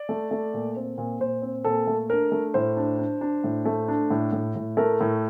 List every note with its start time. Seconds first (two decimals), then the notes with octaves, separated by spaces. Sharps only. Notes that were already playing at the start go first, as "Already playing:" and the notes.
Already playing: D5
0.09 A3
0.31 A3
0.54 A#2
0.76 C4
0.98 A#2
1.20 A#2 C5
1.42 C4
1.64 A#2 A4
1.87 A3
2.10 D4 A#4
2.32 A3
2.54 A2 C5
2.77 D4
2.99 D4
3.21 D4
3.44 A2
3.65 A3
3.88 D4
4.10 A2
4.32 A2
4.55 A2
4.77 A3 A#4
5.01 A2